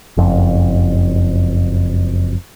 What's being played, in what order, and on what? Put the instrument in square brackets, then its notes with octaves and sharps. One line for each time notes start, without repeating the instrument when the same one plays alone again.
[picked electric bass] F#1 F2